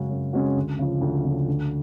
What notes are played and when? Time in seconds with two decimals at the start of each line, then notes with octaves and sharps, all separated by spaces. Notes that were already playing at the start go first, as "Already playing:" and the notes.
Already playing: F#2 C#3 G#3 C#4 F#4
0.10 F#2
0.33 C#3 G#3 C#4 F#4
0.57 D2
0.79 C#3 F3
1.01 D2
1.25 C#3 F3
1.48 D2